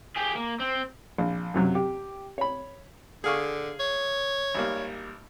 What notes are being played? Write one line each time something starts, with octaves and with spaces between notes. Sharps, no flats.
G4 G#4
A#3
C4
A#1
F#2 C3 F#3
G4
C#5 B5
D3 G#4 F5 C#6
C#5
G#1 G3 A#3